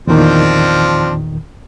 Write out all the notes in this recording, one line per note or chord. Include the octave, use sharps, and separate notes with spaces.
E2 A#2 D#3 F3 C4 D4